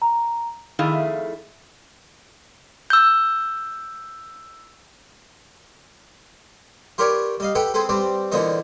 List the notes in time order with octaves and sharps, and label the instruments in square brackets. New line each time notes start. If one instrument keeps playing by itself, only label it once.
[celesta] A#5
[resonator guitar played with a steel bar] F2 D#3 A3 E4 G#4 F5
[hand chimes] E6 G6
[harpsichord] F4 G4 A#4 B4 C#5 D5
G3 D#5 F5
G4 A4 B4 F#5 G5
C4 G#4 A4 B4
G3 C4 B4 D5
E2 A#2 D3 F3 B3 D#4